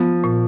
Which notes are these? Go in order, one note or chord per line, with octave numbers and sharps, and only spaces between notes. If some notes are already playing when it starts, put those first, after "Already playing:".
Already playing: F3 B3
A#2